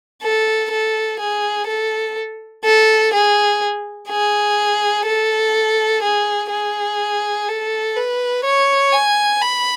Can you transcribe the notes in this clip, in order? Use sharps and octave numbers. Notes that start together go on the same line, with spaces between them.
A4
A4
G#4
A4
A4
G#4
G#4
A4
G#4
G#4
A4
B4
C#5
G#5
B5